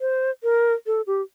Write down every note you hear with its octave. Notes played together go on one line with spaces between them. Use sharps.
C5
A#4
A4
G4